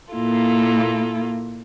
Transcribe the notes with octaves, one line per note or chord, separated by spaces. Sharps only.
A#2 A#3 E4 F4 A4